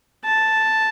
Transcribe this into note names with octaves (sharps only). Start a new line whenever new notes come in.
A5